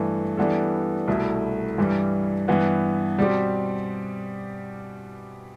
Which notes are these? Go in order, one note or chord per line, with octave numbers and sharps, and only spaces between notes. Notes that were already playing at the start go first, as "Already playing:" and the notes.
Already playing: G2 E3 A3
E3 G3 B3 D4 A4
C2 B2 A3 E4 A4
G2 E3 G3
G2 E3 B3
B2 G3 C4 G4